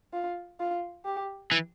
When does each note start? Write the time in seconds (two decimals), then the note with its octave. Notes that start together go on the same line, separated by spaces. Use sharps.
0.13 F4
0.60 F4
1.05 G4
1.52 E3